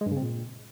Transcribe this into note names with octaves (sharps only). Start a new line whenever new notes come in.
G#3
G2
C#3
C4
A#2